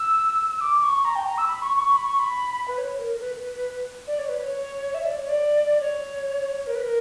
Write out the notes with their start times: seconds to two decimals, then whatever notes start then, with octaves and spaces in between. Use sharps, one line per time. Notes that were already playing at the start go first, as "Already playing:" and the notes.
Already playing: E6
0.57 E6
0.61 D6
0.78 D6
0.84 C#6
1.05 A#5
1.15 G5
1.26 A#5
1.38 E6
1.48 B5
1.62 C#6
1.77 C#6
1.91 B5
2.05 C#6
2.19 B5
2.68 B4
2.78 C#5
2.99 A#4
3.16 A#4
3.21 B4
4.07 D5
4.19 C#5
4.29 B4
4.40 C#5
4.94 E5
5.05 D5
5.18 C#5
5.29 D5
5.80 C#5
6.67 A#4
6.75 B4
6.83 A#4